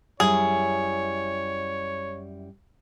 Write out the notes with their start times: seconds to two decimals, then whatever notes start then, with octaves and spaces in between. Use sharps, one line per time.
0.20 F#2 G3 E4 G#4 C#5